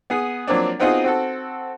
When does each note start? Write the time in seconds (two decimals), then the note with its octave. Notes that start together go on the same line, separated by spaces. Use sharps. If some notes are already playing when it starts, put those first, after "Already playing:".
0.10 B3 G#4
0.47 F3 F#3 A#3 C4 D4
0.79 B3 C4 D#4 F4 F#4 G#4
1.04 C4 F#4 A4